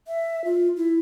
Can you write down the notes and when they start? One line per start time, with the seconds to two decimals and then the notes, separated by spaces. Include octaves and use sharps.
0.07 E5
0.45 F4
0.77 E4